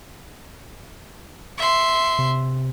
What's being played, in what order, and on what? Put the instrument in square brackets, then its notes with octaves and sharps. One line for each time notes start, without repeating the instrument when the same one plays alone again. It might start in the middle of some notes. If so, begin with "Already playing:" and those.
[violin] E5 C6
[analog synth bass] C3